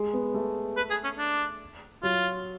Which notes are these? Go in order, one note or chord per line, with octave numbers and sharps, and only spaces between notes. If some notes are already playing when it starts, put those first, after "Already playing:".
Already playing: G#3
B3
A3
B4
G#4
C#4
D4
F#3 F4